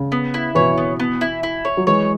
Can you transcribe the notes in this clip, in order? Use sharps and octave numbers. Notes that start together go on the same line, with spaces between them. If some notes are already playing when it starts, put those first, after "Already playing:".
Already playing: C#3
B3
E4
B2 E3 C#5
B3
B3
E4
E4
C#5
F#3
E3 G#3 C#5